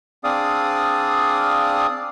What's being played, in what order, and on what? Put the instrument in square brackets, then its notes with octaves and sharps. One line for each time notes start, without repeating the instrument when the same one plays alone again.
[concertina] C4 D4 G#4 D5 F5 D#6